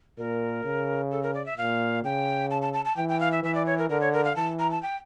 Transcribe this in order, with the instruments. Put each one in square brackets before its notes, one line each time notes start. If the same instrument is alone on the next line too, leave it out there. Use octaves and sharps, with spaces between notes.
[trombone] A#2 [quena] A#4
[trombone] C#3
[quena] A4
A#4
D5
E5
[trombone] A#2 [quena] F5
[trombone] C#3 [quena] G5
[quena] A5
A5
A5
A5
[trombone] E3 [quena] G5
[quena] G5
F5
E5
[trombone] E3 [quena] E5
[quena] D5
C#5
A#4
[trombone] D3 [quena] A#4
[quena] C#5
A#4
F5
[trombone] E3 [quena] A5
[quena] A#5
A5
G5